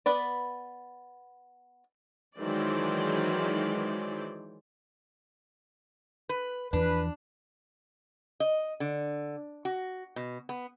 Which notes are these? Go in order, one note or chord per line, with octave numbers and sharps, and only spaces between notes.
B3 B4 D5
D#3 E3 F#3 G#3 C5 D5
B4
E2 E3 F3 D4 B4
D#5
D3
F#4
B2
B3